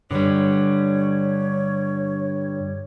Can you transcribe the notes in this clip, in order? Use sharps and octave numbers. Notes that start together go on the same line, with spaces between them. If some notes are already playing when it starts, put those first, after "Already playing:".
G2 D3 G3 C#5